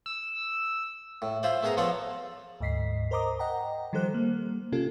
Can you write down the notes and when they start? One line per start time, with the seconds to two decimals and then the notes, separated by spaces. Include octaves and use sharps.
0.06 E6
1.22 A2
1.43 E4 F4 C5 D5
1.63 A3 B3 G#4 A#4 A#5
1.77 F3 B3 F4 A4 C#5 D5
2.60 D2 G#2 D#5 B6 C7
3.11 A#4 C5 D#5 A#5 D6 D#6
3.39 D#5 F#5 G5 A#5
3.93 D#3 F3 G3 A4 C5 F#6
4.14 G3 A#3
4.72 C3 C#4 F4 G4 A4